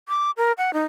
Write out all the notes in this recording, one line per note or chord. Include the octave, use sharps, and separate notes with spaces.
D6
A#4
F#5
D#4